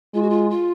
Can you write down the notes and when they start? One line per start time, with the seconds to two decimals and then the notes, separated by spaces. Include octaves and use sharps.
0.14 G#3 F4
0.22 F#4
0.30 F4
0.50 F4